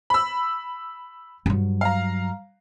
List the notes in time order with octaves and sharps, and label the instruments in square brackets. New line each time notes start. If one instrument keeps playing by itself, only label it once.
[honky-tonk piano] B5 E6
[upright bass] G2 F#3
[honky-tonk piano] F5 A#5